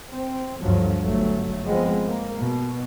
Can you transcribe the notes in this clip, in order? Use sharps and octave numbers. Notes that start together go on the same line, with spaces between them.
C4
D2 G2 F3 F#3
G1 F#3 A3
F3 G#3 B3 C4
A#3
B2